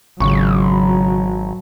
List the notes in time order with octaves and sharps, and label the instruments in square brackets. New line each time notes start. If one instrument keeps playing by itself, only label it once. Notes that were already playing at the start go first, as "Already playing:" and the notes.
[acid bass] G#1 [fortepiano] C#2 C#6 [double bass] F#3